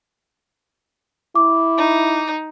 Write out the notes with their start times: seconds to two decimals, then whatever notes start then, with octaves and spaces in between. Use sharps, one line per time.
1.35 E4 D6
1.78 D#4